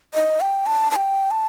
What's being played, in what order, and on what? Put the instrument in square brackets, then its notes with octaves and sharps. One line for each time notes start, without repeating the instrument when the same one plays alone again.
[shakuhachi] D#5
G5
A5
A5
G5
A5